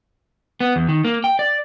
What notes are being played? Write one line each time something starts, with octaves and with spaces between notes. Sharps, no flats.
B3
E2
D#3
A#3
G5
D5